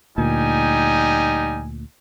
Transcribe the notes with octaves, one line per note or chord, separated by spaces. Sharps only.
D2 A#2 G3 D#4 G#5